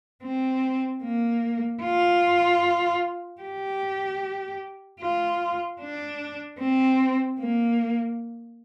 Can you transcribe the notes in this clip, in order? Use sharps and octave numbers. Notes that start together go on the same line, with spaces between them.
C4
A#3
F4
G4
F4
D4
C4
A#3